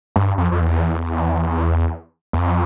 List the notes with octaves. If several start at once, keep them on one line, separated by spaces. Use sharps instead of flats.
G2
F2
F2
E2
E2
F2